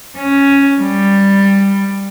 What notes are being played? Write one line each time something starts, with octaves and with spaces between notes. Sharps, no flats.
C#4
G3